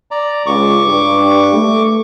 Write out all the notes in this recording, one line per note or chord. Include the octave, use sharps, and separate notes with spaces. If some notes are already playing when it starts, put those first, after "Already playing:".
D5 A#5
C#2 C#6 D6
G2
A3